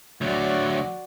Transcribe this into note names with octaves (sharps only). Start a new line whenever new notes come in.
D2 F#3 F#4 D5